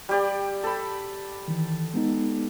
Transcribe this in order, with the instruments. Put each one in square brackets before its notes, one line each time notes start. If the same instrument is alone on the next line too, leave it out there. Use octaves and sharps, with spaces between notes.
[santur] G3 G4 D5
A4 B5
[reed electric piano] D#3 E3
G#3 B3 D#4